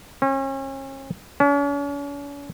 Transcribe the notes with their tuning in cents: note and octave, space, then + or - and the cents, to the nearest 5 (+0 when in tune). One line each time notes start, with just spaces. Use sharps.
C#4 -40
C#4 +40